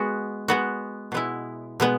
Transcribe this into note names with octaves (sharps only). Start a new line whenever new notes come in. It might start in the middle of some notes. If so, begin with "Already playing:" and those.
Already playing: G#3 B3 F#4
G#3 B3 F#4
B2 G#3 B3 E4
B2 G#3 B3